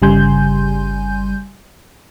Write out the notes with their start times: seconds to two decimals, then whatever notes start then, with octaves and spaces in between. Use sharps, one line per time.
0.02 G1 C#3 G3 G#5 C6 G6